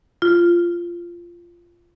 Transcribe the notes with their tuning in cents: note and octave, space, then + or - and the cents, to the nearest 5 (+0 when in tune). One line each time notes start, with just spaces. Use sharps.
F4 -15